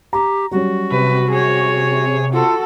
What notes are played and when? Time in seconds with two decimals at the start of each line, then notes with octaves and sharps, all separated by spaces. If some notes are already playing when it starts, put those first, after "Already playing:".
0.13 G4 A#5
0.51 F#3 G3 C#4 F#4
0.92 C3 B4
1.30 G#4 C#5
2.33 F4 F#4 A4